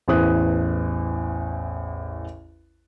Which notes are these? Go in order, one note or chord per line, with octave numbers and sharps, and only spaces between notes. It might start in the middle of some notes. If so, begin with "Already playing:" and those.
A1 E2 C5 D#6 F#6